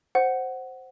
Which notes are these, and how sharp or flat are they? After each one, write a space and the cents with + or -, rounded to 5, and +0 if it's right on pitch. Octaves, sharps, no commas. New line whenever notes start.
C5 +0 F#5 +5